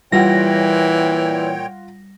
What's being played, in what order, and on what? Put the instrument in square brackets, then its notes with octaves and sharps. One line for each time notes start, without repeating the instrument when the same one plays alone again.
[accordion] A#2 C#5 G5 [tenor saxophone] E3 [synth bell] G3 A#6 [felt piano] F4 F#5